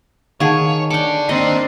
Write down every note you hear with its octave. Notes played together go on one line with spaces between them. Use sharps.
D#3 G#4 C#5 F5 F#5 A5
A4 D5 G5 D6 C#7
A#3 C4 D4 D#4 D#5